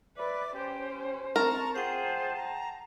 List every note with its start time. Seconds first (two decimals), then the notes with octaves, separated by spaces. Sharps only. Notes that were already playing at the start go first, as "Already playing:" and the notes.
0.17 B4 D5 E5 D6
0.53 C#4 G4 C5 G5
1.36 C4 A#4 A5 A#5 C#6
1.76 F4 G#4 C5 F#5 G5
2.05 A5
2.37 A#5